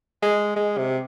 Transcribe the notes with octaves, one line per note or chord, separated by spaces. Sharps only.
G#3
G#3
C3